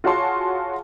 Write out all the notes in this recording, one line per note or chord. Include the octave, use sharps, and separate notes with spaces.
F4 F#4 G#4 C#5 A5 C6